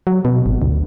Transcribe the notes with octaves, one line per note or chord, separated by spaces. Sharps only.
F#3
B2
G#1
D2